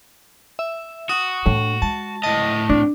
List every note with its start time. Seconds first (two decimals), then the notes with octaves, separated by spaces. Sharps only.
0.59 E5
1.09 F#4 D#6
1.46 A2 A3 D4
1.82 G#3 A5
2.23 A2 D#5 A5
2.70 C4 D4